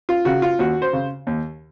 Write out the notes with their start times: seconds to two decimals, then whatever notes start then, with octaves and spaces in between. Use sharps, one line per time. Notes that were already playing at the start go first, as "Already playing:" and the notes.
0.09 F4
0.25 C#3 F#4
0.42 F4
0.59 D#2 F#4
0.82 C5
0.93 C#3
1.27 D#2